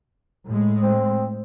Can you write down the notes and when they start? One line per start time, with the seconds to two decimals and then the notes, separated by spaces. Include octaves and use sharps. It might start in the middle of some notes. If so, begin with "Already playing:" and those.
0.46 A2 G#3
0.83 C4